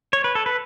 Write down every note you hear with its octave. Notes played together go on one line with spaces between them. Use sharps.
C#5
B4
A4
B4